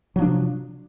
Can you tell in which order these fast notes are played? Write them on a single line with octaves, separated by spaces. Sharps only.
F#3 F3 D4 C3